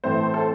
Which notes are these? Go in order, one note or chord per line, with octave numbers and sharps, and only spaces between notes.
A2 E3 A3 C4 C5
A4